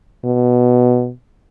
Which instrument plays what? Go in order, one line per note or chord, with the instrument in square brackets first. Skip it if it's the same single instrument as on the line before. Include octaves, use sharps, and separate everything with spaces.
[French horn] B2